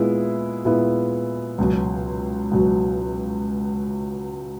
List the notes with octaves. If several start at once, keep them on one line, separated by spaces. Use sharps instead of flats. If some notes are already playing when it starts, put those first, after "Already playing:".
Already playing: A#2 G#3 B3 E4
A#2 G#3 B3 E4
C#2 B2 F#3
C#2 B2 F#3